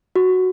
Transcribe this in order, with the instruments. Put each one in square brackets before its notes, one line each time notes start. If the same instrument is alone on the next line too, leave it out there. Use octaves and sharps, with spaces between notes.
[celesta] F#4